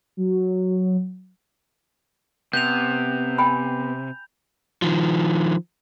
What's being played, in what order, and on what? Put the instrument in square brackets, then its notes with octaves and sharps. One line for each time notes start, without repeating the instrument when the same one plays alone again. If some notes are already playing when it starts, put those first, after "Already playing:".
[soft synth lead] F#3
[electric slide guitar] C3 [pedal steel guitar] B3 [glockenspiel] G6 F7
[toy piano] G5 G#5 B5
[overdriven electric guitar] D#3 F3